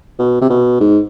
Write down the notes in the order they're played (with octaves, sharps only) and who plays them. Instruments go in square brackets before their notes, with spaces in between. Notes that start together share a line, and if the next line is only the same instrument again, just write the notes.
[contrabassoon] B2
C3
B2
G#2